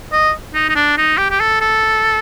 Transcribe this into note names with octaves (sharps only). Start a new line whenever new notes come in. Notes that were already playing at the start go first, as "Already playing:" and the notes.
D#5
D#4
D#4
D4
D#4
G4
G4
A4
A4